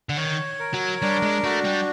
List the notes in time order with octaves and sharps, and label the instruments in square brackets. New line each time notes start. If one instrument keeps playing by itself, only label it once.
[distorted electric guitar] D3
[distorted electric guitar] D#3 [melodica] C#5
[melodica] A#4
[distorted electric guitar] F#3
[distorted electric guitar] G3 [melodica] D4
[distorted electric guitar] G#3
[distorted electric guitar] A3 [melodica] F#4
[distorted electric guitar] G3